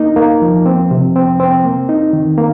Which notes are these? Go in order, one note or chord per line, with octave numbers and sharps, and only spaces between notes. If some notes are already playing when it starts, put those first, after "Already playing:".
Already playing: A#3 D#4
A#3
F3
C4
C3
C4
C4
A#3
D#4
D#3
A#3